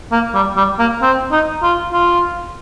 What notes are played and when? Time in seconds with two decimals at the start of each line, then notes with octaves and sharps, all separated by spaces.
0.12 A#3
0.34 G3
0.57 G3
0.79 A#3
1.02 C4
1.32 D#4
1.63 F4
1.93 F4